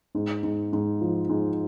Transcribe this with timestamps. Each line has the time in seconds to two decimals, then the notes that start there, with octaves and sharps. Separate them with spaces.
0.15 G#2
0.43 G#2
0.73 G#2
1.01 F3
1.29 G#2